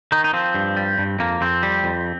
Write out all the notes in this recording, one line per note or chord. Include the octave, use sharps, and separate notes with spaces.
D#3 D#4
D#4
F3 C4
G2
G3
G2
F2 A#3
F2 C4
G3
F2